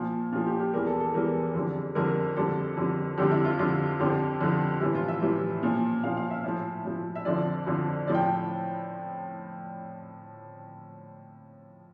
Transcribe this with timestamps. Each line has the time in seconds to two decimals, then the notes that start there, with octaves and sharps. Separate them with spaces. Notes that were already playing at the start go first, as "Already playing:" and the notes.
Already playing: A#2 F3
0.32 A#2 F4
0.36 F3
0.46 G4
0.60 G4
0.73 E2 E3 G3 A#4
0.87 A4
1.00 A4
1.14 E2 E3 G3 A#4
1.54 F2 D3 G3
1.95 F2 D3 G3 A#4
2.36 F2 D3 G3 A4
2.77 F2 D3 G3
3.18 F2 D3 G3 G4
3.31 E4
3.45 F4
3.59 F2 D3 G3 F4
4.00 F2 D3 F3 G4
4.41 F2 D3 F3
4.80 A2 E3 G3 E4
4.95 F4
5.08 E5
5.22 A2 E3 G3
5.62 A#2 F3
6.04 A#2 F3 F5
6.17 F5
6.30 E5
6.44 A2 F3
6.85 A2 F3
7.15 E5
7.25 F2 D3 F3 D5
7.67 F2 D3 F3
8.07 A2 F3 D5
8.15 G5